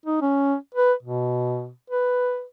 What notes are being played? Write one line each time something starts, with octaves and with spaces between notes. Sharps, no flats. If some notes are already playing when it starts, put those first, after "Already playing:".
D#4
C#4
B4
B2
B4